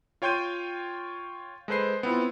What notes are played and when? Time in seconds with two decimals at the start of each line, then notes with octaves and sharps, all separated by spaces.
0.22 F4 C#5 G5 C6 G6 D#7
1.68 G#3 A4 B4 C5 C7
2.03 B3 C4 E4 F4